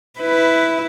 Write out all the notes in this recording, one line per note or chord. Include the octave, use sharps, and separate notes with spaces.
E4 B4